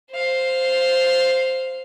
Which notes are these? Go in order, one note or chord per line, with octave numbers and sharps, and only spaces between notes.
C5 F5